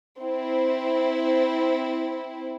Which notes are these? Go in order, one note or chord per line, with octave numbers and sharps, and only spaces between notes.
C4 E4